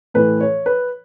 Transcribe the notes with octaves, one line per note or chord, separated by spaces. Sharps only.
A2 E3 B4
C#5
B4